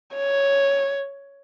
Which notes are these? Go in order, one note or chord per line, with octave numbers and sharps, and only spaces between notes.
C#5